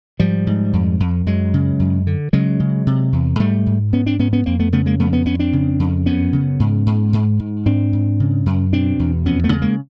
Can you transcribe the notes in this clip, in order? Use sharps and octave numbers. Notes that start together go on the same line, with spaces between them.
G#2 F3 G3
G#2
F2
F2
F#2 F#3 G#3
C#3
F#2
D3
C#3 F#3 G#3
C#3
C3
E2
G#2 G3 A3
G#2
G#2 B3 C#4
C4 D4
G#2 B3 C#4
B3 C#4
F2 A#3 C4
A3 B3
C#3 A3 B3
G#3 A#3
F2 A3 B3
B3 C#4
F2 B3 C#4
C4 D4
C#3
F2
F#2 B3 C#4
C#3
G#2
G#2
G#2
G#2
G#2 C4 D4
G#2
C#3
F#2
B2 C4 D4
E2
F2 B3 C#4
A3 B3
C#3
G#3 A#3